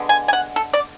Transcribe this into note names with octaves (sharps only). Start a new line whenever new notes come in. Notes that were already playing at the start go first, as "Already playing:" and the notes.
Already playing: D3 G#3 B3
G#5
G#5
F#5
A4
D5